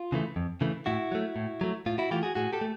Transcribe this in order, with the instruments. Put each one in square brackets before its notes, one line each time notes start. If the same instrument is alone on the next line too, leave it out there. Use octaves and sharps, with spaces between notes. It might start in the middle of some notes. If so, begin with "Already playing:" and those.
Already playing: [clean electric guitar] F4
C#3 E3 A3
F2
C#3 E3 A3
A2 E4 F#4
F#3 A3
A2
F#3 A3
A2 F4
E4 F#4
E3 A3 F4 G4
F#4 G#4
A2 F#4 G#4
G4 A4
A3